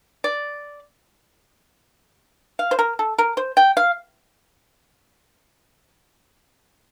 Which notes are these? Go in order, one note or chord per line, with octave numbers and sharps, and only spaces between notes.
D5
F5
C5
A#4
A4
A#4
C5
G5
F5